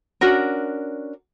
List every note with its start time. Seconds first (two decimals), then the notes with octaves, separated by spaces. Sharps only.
0.21 C#4 D4 F#4 A#4